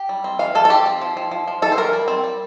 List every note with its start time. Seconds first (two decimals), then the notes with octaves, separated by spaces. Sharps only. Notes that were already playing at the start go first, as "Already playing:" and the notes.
Already playing: G4
0.09 G3
0.24 C4
0.39 E3 F5
0.55 E3 A4
0.65 A4
0.70 F3 G4
0.86 C4
1.01 F3
1.17 F3
1.31 F3
1.47 F3
1.62 E3 A4
1.72 C5
1.77 E3 A#4
1.93 G3
2.08 C4
2.24 G3